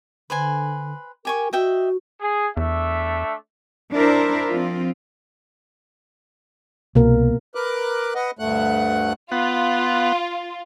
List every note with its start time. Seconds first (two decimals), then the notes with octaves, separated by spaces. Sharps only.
0.30 D3 B4 C5 G#5
1.25 G4 A#4 G#5 C#6
1.53 F#4 D#5 E5 G5
2.21 G#4
2.57 E2 A3 D4 E5
3.94 D4 E4 A#4 C5 E5
4.50 F3 C4 F4
6.95 C2 B2 A#3 A#4
7.55 A#4 B4 D6 F#6
8.15 B4 D#5 F#5
8.39 D2 G2 A3 F#5 F#6
9.32 B3 F4 F#5